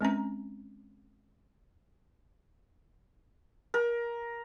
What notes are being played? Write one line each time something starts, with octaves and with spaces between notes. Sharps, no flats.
G#3 C4 C#4 A#5
A#4